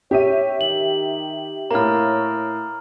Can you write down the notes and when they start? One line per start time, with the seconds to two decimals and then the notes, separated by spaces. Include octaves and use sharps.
0.11 G4 C#5 E5 D#7
0.61 D#3 F#7
1.71 A2 A#3 C#5 A#5 F6